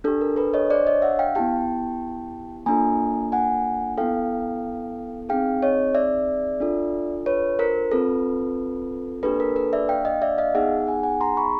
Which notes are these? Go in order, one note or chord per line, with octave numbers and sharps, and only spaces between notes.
D4 G4 A4
A#4
A4 B4
C#5 D#5
C5 D5
C#5 D#5
E5 F#5
F5 G5
B3 E4 G4 G5 A5
A#3 D4 F4 A4 G#5 A#5
F#5 G#5
B3 E4 A4 F5 G5
C4 D#4 G#4 F5 G5
C#5 D#5
D5 E5
D4 F4 A4
B4 C#5
A#4 C5
C4 F4 A4 B4
A#3 D4 G4 A4 B4
A#4
A4 B4
D5 E5
F5 G5
D#5 F5
D5 E5
D#5 F5
B3 D#4 G#4 E5 F#5
F#5 G#5
F#5 G#5
A#5 C6
B5 C#6